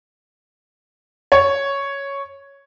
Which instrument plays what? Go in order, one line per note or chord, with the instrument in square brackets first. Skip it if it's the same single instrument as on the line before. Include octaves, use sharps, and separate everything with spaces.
[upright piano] C#5